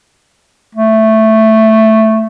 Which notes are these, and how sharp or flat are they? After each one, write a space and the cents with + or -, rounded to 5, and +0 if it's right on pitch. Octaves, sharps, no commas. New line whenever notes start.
A3 +5